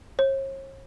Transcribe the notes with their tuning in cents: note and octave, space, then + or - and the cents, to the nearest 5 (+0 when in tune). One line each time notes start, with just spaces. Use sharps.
C#5 -45